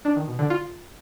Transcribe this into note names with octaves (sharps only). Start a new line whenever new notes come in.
D4
D#3
B2
D3
F4